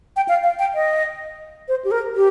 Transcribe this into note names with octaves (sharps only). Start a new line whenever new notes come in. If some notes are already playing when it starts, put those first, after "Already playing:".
G5
F5
F5
G5
D#5
C5
G4
A#4
G4